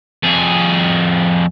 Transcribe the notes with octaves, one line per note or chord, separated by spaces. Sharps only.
F2 G#4